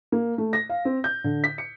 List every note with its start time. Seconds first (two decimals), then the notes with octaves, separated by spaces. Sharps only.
0.12 A#3
0.38 A3
0.53 A#6
0.70 F5
0.85 C4
1.04 G6
1.24 D3
1.44 B6
1.58 C#7